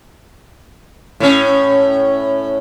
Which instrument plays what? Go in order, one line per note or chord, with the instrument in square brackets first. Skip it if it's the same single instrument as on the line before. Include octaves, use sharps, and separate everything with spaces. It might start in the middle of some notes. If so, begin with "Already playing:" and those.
[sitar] A2 C#4